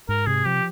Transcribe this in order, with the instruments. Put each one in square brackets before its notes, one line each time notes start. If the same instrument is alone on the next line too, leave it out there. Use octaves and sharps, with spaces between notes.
[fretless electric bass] G#2 [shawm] A#4
[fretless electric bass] C3 [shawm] G#4
[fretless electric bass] F3 [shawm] G4